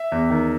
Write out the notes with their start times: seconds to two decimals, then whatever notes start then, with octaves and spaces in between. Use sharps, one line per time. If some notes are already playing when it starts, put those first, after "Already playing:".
Already playing: E5
0.12 E2
0.30 D#3